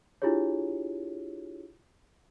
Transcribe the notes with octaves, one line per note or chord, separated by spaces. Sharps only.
D4 E4 F4 G4 G#4 C#5